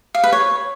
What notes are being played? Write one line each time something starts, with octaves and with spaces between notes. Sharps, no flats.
F5
B4
C#5